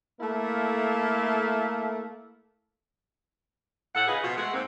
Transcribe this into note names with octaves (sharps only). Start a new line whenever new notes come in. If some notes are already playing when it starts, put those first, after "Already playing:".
A3 A#3 E4 A4 F5
A2 A4 F#5
C#3 F4 G#4 B4 D#5 F5
B2 F3 F4 F#4
G#3 A3 F#5
G#2 A#3 C4